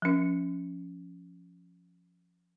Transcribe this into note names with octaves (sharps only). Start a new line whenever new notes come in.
F3 C#4